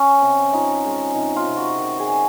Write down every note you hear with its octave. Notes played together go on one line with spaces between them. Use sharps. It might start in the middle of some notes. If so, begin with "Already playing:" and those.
Already playing: C#4
C3
F3 D#4
G#3
C3 D#4
F4
C3
F#4
D#3
G#4
F#3